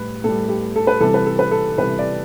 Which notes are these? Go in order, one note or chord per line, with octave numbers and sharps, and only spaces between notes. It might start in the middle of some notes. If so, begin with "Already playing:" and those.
Already playing: A2 G3 B4
A2 G3 A4
G4
A4
B4
C3 E3 G3 A4
B4
A4
B4
A4
C3 E3 G3 B4
D5